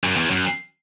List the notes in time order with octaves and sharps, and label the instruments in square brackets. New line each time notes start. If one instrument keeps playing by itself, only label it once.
[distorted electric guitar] F#2
E2
F#2